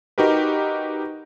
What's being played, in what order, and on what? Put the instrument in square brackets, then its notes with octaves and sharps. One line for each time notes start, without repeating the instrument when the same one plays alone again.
[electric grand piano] D#4 F#4 G4 A#4 B4